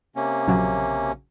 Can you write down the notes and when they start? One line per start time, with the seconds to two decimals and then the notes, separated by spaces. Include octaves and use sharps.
0.16 C3 A#3 C#4
0.47 A#1 C#3 F#3